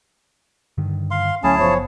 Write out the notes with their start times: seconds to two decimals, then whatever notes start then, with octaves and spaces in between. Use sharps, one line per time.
0.78 G2 D3 D#3
1.11 F5 C6
1.43 D2 F#3 A3 C#4 E4 G#4 A5
1.59 F#1 F3 B3 C#5